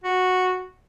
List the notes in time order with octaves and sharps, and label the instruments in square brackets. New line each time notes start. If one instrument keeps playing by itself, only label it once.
[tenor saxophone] F#4